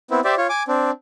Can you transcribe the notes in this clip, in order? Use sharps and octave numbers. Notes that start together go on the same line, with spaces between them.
B3 C4 E4
G4 C5 D5 E5
F4 C#5
G#5 D6
C4 D4